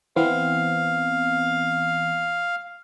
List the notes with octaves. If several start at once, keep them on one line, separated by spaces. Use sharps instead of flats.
E3 B3 C4 F5